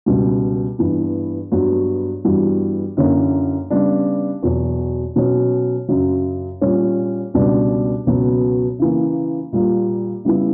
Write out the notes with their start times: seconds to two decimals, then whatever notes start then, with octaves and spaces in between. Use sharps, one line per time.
0.06 C#2 B2 G3
0.79 G2 E3 B3
1.52 G2 F#3 B3 F#4
2.24 G2 E3 G3 B3 F#4
2.97 F#2 D3 A#3 C#4 E4
3.70 C#3 G3 B3 D4
4.43 E2 B2 F#3
5.16 B2 F#3 C#4
5.89 F#2 C#3 F#3
6.62 A#2 G3 C#4
7.34 C#2 B2 G3 B3 D4
8.06 C#2 B2 F#3 B3
8.79 C#3 E3 A#3
9.53 A#2 G3 A#3
10.25 C#3 G3 B3 E4